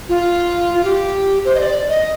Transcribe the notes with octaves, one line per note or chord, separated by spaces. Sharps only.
F4
F4
G4
C5
D#5
D5
D#5